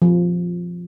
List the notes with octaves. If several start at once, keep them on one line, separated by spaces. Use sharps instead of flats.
F3